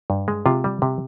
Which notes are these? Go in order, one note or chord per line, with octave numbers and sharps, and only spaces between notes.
G2
G#3
C3 F4
G3
C3